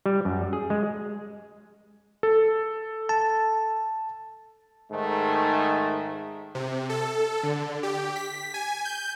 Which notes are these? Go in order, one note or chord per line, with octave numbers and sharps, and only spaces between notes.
G3
F#2
G#4
G#3
A4
A5
G#2 D#3 A3
C3
A4
D3
G4
B6
G#5
G6